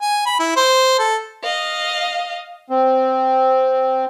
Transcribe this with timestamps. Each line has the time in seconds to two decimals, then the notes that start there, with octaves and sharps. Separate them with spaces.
0.02 G#5
0.26 B5
0.40 E4
0.57 C5
0.99 A4
1.44 D#5 F5
2.70 C4